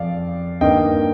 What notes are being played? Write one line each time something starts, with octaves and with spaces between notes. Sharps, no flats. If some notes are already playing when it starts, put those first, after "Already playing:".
Already playing: F2 F3 D5 F5
G2 D#3 A#3 D#5 G5